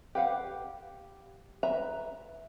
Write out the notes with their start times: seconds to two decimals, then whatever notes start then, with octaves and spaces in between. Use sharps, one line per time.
0.15 G4 B4 F5 F#5
1.63 B4 E5 A#5